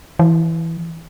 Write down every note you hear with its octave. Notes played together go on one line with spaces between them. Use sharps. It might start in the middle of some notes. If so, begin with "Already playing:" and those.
E3